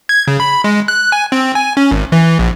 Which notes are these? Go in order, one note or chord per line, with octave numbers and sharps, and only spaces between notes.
G#6
C#3
B5
G#3
F#6
G#5
C4
G#5
C#4
G#1
E3
A#1